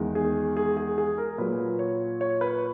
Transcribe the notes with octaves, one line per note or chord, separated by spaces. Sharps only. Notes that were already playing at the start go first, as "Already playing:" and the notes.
Already playing: E2 D#3 G#3
G#4
G#4
G#4
G#4
A#4
A#2 F#3 B4
C#5
C#5
B4